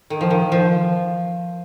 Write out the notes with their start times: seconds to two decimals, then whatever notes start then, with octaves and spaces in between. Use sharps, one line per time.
0.10 D#3
0.21 F3
0.30 D#3
0.52 F3